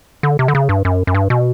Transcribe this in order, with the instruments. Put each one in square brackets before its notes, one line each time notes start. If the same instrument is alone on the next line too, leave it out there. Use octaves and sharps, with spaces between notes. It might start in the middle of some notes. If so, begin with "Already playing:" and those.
[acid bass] D3
C3
D3
C#3
G2
F#2
F#2
G2
B2